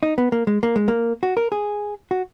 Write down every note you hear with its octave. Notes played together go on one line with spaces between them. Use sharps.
D#4
B3
A#3
G#3
A#3
G#3
A#3
F#4
A#4
G#4
F#4